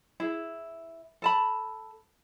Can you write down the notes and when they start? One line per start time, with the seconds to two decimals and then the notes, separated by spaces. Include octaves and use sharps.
0.20 E4 G#4
1.22 A4 A5 B5